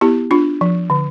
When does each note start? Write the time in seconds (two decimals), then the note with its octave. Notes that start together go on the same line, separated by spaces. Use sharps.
0.01 B3 E4 G4
0.31 D4 F4
0.61 F3
0.90 D3